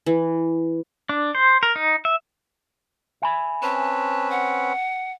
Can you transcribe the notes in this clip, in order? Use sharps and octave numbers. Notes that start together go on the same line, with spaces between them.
E3
D4
C5
A#4
D#4
E5
E5 G#5 B5
C4 C#4 B4 A5
F#5